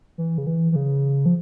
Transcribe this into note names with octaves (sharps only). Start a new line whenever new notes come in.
E3
C#3
E3
E3
C#3
F3